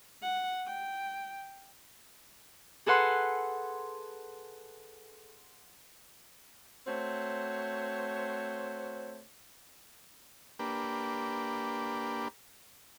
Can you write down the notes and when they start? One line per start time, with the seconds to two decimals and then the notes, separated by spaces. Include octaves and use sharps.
0.22 F#5
0.66 G5
2.86 G#4 A4 B4 F#5 C6
6.86 A3 C4 F#4 C5 C#5
10.59 A#3 D4 G4 B4